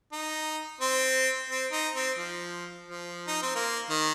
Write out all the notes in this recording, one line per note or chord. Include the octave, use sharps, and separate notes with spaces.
D#4
C4
C4
D#4
C4
F3
F3
D#4
C4
A#3
D#3